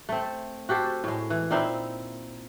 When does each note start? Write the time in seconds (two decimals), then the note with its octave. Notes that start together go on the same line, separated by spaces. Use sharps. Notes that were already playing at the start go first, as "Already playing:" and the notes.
0.09 A3 C4
0.69 F#4 G4 A4 C5
1.04 A2 G#3
1.30 E3
1.51 A#2 C4 D#4 E4